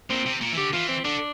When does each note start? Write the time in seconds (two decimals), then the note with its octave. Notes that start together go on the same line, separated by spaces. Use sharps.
0.10 A#2 C4
0.26 C3
0.41 A#2
0.52 E3
0.57 D3 G4
0.73 E3 F4
0.88 C4
1.04 D3 D4